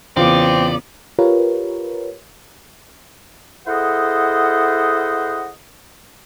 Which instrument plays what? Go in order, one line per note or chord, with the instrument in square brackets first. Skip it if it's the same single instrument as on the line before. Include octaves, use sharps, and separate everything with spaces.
[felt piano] E2 F4 D6 [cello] C#3 B3 [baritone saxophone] C4 [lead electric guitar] D5
[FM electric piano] F4 G4 A#4 B4 C#5
[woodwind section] E4 G#4 A4 C5 D#5 F#5